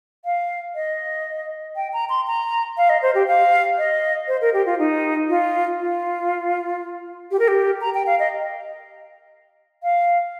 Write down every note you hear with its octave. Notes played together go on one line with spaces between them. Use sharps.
F5
D#5
G5
A#5
C6
A#5
F5
D#5
C5
G4
F5
D#5
C5
A#4
G4
F4
D#4
F4
F4
G4
A#4
G4
A#5
G5
F5
D#5
F5